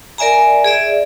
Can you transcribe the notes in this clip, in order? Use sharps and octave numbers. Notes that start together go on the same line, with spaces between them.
A#4 D5 E5 G#5 A#5
G#4 D5 E5